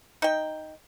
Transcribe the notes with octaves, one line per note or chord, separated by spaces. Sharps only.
D#4 G5